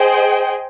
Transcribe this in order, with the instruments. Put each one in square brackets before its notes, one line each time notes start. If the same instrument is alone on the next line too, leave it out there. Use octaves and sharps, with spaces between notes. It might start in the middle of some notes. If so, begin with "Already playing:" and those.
Already playing: [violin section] G#4 C5 D#5 G5